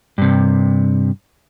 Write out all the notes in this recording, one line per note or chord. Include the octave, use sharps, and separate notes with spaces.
G2 C3